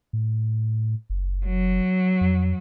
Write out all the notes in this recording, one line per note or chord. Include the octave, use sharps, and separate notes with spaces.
A2
F#1
F#3
F2